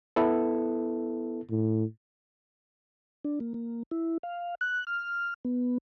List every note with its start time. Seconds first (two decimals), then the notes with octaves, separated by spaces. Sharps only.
0.16 B3 E4 A4
1.50 A2
3.25 D4
3.40 A#3
3.54 A#3
3.91 E4
4.23 F5
4.61 F#6
4.87 F6
5.45 B3